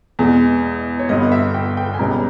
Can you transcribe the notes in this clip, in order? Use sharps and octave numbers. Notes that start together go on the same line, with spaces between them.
E2 B2 G#3
C#5
G1 G2 G3 B3 D#5
E5
G5
G5
G#5
C#2 B2 G3 C#4 A#5